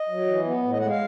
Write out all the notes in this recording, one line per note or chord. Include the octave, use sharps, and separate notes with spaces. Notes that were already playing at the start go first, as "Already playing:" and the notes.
Already playing: D#5
F#3
E3
B3
A2
D#5
G#3 F#5
F5